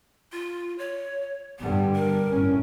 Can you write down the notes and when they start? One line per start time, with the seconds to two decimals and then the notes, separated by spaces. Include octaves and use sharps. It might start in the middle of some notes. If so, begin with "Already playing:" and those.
0.32 F4
0.78 C#5
1.59 G2 D3 G3 B3
1.96 A#4
2.30 G1 A2 C#4